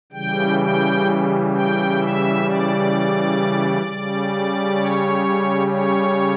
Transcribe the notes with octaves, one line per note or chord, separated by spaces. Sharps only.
C#3 E3 G3 G5
G5
G5
E5
D5
C#3 G3
C#5
C#5